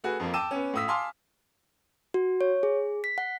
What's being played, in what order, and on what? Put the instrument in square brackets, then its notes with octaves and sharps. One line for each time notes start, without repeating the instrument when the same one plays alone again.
[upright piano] A3 F#4 G#4 B4
F2 F3 A#3
G5 A5 D6 E6 D#7 E7
B3 C#4
A2 F4 D#6 E6 B6
F5 G#5 A5 C6 D6 F6
[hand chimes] F#4
C#5
G#4
B6
F#5